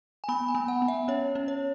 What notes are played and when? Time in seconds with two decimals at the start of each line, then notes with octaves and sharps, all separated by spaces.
0.24 G#5
0.29 B3 B5
0.49 G#5
0.55 B3
0.68 F#5
0.82 B3
0.88 E5
1.08 C#4 C#5
1.35 C#4
1.48 C#5